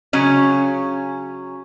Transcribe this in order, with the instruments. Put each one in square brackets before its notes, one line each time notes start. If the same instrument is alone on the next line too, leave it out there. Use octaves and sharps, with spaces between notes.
[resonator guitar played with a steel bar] C#3 F#3 C#4